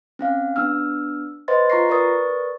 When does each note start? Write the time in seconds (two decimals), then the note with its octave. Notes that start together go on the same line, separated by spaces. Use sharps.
0.19 C4 C#4 F5
0.56 B3 D4 E6 F6
1.48 B4 C5 D#5 C6 A6
1.70 F4 A#5 C#6 A#6 C7
1.89 A#4 B4 D5 C#6 D#6 A6